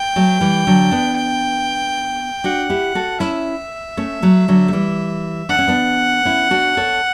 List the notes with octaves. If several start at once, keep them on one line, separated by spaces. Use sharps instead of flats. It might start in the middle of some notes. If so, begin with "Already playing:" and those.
Already playing: G5
F#3 A3
E3 G3
D3 F#3
B3 D4
D4 F#4 F#5
E4 G4
F#4 A4
C#4 E4 E5
A3 C#4
F#3 A3
D3 F#3
A3
E3 G3
D4 F#5
C#4
B3 D4
C#4 E4
D4 F#4
A4 C#5